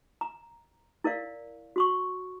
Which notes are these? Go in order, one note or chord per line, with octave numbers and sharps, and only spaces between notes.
A#5
E4 A#4 D5 F5
F#4 C6 C#6